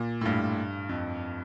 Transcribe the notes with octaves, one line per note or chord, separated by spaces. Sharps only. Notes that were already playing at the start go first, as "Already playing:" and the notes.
Already playing: A#2
A2
G2
F2